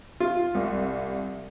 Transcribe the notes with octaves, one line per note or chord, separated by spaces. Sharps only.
F4
C2